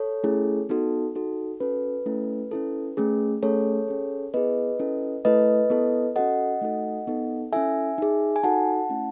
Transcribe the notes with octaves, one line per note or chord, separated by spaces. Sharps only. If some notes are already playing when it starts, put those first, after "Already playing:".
Already playing: A4 C#5
A3 C#4 E4 G#4
B3 D#4 F#4 A4
D#4 F#4 A4
C#4 F#4 A4 B4
A3 C#4 E4 A4
C#4 E4 A4
A3 C#4 G#4
A3 C#4 G#4 A4 C#5
C#4 G#4
B3 E4 G#4 B4 D#5
C#4 E4 A4
A3 E4 A4 B4 D#5
B3 E4 A4
C#4 F#4 A4 D#5 F#5
A3 D#4 F#4 A4
B3 D#4 A4
C#4 E4 A4 E5 G#5
D#4 G#4
G#5
D#4 F#4 A4 F#5 A5
A3 C#4 E4